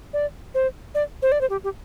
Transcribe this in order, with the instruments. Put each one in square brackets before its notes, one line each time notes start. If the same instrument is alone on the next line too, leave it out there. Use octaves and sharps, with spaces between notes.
[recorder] D5
C5
D5
C5
D5
C5
G4
G4